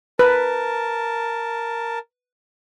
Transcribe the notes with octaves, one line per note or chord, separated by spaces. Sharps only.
A#4 B4 A5